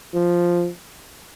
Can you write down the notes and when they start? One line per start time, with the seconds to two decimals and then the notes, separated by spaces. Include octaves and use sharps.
0.15 F3